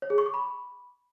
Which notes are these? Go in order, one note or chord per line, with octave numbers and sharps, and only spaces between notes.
C#5
G#4
C#6
D6
B5